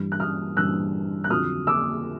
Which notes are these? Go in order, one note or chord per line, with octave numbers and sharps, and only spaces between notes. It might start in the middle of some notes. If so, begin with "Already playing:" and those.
Already playing: G2 E3 G3
F#6
D#6 F6
G2 E3 G3 E6 F#6
F#6
F2 D3 F#3 D#6 F6
D6 E6